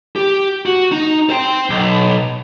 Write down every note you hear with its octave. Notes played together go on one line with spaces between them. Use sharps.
G4
F#4
D#4
C5 G5
B1